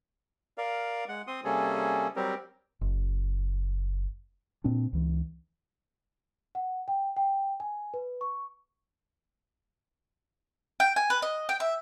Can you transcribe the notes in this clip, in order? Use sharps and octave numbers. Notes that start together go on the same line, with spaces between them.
A#4 D5 F5
G#3 F#5
C4 C6 D#6
C3 G3 A#3 C#4 G#4 A4
F#3 G3 C4 G4 A#4
F#1
A#2 C4 D4
C#2 E3
F#5
G5
G5
G#5
B4
C#6
G5
G#5
B4
D#5
G5
E5